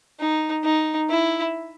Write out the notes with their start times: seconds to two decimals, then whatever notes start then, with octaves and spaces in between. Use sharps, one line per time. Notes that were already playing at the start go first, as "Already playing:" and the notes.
0.20 D#4
0.64 D#4
1.10 E4